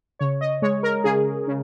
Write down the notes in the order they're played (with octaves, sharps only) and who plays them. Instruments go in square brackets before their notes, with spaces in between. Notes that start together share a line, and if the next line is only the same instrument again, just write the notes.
[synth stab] C#3 C#5
D#5
G#3 C#5
A#4
C#3 G#4
C#3